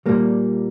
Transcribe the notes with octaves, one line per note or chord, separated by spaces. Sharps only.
A#2 G3 A#3